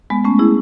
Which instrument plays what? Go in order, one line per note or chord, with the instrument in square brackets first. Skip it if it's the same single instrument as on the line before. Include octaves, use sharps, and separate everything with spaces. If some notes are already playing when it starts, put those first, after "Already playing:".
[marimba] G#3 B3
A3 C#4
E4 G#4